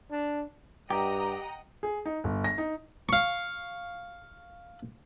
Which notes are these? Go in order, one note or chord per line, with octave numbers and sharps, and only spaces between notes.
D4
G2 G4 D#5 F#5 G5 A#5
G#4
D#4
G1
A#6
D#4
F5 C#6